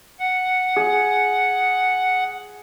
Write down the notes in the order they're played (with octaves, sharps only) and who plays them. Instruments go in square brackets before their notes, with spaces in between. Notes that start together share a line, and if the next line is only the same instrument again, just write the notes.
[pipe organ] F#5
[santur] G#4